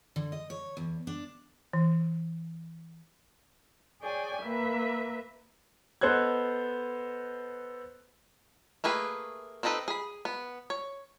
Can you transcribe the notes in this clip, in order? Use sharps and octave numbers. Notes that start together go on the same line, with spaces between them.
D3
D#5
C#5
E2
D4
E3
G#4 C#5 D5 G5 G#5
A#3 B4 E5
B3 A4 C5 D#5 F#6 G#6
A3 A#3 G#4 B4
C4 D4 D#4 A4 B4
G#4 B5
B3
C#5